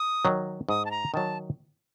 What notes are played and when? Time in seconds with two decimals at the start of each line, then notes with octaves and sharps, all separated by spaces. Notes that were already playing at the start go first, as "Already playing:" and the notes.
Already playing: D#6
0.25 D#3 F#3
0.69 G#2 D#6
0.85 A5
0.91 A#5
1.14 D#3 F#3 A5